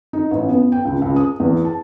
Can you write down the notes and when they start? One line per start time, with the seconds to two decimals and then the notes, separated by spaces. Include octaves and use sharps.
0.13 D#4
0.31 A1
0.49 B3
0.72 G5
0.85 C#2
1.02 C#2
1.16 D#6
1.40 E2
1.65 A5